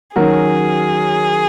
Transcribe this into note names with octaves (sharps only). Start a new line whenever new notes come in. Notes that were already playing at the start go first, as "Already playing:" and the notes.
D#3 F#3 C#4 F#4 G#4 A#4